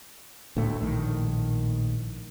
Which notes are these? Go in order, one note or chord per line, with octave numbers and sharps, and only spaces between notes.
D2 A2 A3
A#1 A2 D#3